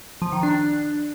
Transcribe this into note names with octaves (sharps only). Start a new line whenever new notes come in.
F3
D#3
D4